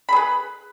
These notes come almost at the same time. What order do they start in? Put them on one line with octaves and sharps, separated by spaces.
B5 G#4 B4